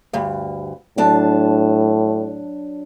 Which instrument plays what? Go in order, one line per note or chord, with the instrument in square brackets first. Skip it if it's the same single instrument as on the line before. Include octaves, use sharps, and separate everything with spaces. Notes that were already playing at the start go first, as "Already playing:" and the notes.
[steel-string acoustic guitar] D2 G2
[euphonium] A2 [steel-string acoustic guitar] F#3 D4 A5